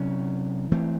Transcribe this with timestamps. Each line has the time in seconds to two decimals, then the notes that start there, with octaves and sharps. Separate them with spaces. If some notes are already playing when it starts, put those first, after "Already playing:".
Already playing: C3 F#3 C#4
0.72 E3 A3 C4